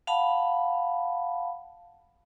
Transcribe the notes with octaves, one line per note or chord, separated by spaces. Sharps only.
F5 F#5 A5 B5